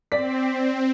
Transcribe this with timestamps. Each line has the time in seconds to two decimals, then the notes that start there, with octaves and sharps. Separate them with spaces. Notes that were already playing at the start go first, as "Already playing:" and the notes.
0.12 C4 D5 B6